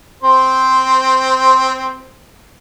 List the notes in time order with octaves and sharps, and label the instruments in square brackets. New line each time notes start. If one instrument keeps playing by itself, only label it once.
[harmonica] C4 C5